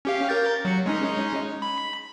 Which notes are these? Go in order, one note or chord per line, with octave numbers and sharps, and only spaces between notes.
C#4 G4 F5
A#4 G6 A6
F#3 C#7
G#3 C#4 D#4
B5